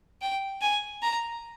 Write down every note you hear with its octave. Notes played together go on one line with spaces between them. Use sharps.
G5
G#5
A#5